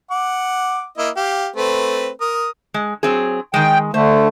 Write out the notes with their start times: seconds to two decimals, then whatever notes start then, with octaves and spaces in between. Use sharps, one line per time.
0.11 F#5 D6
0.98 A#3 E4 D#5
1.17 G4 F5
1.56 A3 C4 B4
2.21 A#4 D#6
2.74 G#3
3.03 F#3 C4 G#4
3.54 D#3 G#3 G5
3.94 D3 A3 C5